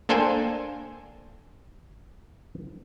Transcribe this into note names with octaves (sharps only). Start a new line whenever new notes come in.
A#3 D4 A4 C5 G5 G#5